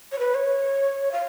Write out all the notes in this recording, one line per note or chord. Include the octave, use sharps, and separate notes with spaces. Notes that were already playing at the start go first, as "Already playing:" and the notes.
C#5
B4
C#5
F5